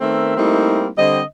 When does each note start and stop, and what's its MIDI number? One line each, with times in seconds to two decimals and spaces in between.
0.01 0.33 51
0.01 0.33 57
0.01 0.33 59
0.01 0.33 60
0.01 0.33 70
0.01 0.33 76
0.37 0.88 55
0.37 0.88 57
0.37 0.88 58
0.37 0.88 60
0.37 0.88 63
0.37 0.88 64
0.97 1.22 50
0.97 1.22 55
0.97 1.22 60
0.97 1.22 75